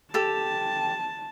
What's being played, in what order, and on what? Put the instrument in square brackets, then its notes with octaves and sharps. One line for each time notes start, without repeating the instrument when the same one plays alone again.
[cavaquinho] G4 A4 [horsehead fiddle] A5